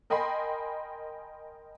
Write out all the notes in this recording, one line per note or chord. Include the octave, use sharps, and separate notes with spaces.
A#4 D#5 G5 G#5 B5 C6